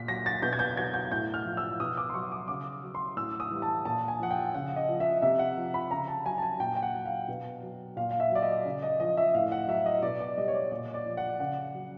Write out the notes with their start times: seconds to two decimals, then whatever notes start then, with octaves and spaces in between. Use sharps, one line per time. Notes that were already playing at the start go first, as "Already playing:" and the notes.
Already playing: A#2 B6
0.08 F#3 A#6
0.26 A6
0.42 B2 G6
0.53 G#6
0.59 G6
0.77 F#3 G#6
0.94 G6
1.12 A2 G6
1.34 F6
1.45 F3
1.57 E6
1.80 B2 D#6
1.97 D6
2.09 C6
2.14 F#3 C#6
2.32 D6
2.48 C#3 D6
2.83 F#3
2.95 C6
3.17 A2 E6
3.40 D#6
3.51 E3 G3
3.62 A5
3.85 A#2 A5
4.08 G#5
4.20 F3 F#5
4.31 G5
4.54 C#3 F#5
4.76 D#5
4.89 F3
5.00 E5
5.22 C3 E5
5.39 F#5
5.57 F3
5.74 B5
5.91 C#3 A#5
6.08 A5
6.25 F#3 G#5
6.38 A5
6.43 G#5
6.60 A#2 G5
6.76 G5
6.82 F#5
6.94 F#3
7.06 F5
7.28 B2
7.63 F#3
7.96 A#2 F5
8.11 F5
8.20 E5
8.31 F#3 D5
8.42 D#5
8.65 C#3
8.82 D#5
9.00 F3 D#5
9.17 E5
9.34 A2 F5
9.52 F#5
9.68 F#3 E5
9.86 D#5
10.03 B2 D5
10.20 D5
10.37 G3 D#5
10.48 C#5
10.54 D5
10.71 A#2 D5
10.94 D5
11.06 F3
11.17 F#5
11.39 C#3 F#5
11.75 F#3